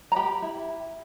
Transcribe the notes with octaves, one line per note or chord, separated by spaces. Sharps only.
A#5
G4 B5
E4